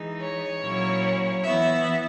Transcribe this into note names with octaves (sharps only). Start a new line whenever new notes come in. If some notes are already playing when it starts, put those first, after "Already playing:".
Already playing: E3 G#3 D#4
C#5
A#2 F#3 C#4 E4
E3 B3 E4 E5